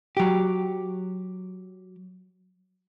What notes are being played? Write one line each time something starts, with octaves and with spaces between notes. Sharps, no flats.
F#3 G4